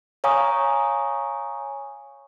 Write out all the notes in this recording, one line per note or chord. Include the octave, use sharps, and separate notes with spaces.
C#5 F5 G#5 A#5 C#6 D#6